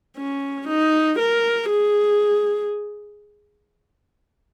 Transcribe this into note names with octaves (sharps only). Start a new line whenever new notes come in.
C#4
D#4
A#4
G#4